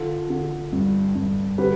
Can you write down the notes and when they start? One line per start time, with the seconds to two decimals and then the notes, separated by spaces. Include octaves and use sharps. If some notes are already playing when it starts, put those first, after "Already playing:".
Already playing: D3 F4 A4
0.30 D3
0.73 G2
1.15 G2
1.58 D3 G4 B4